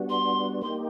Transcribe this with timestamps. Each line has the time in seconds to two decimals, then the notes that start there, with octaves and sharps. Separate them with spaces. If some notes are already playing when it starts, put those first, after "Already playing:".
Already playing: G3 B3 D4 F#4
0.09 C6
0.62 A#3 D#4 G4 C6